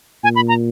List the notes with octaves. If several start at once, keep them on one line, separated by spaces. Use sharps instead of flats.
A#2 G#5
B5
A#5